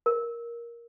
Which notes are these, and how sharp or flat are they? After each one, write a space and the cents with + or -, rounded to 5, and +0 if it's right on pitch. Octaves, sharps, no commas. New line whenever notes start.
A#4 +10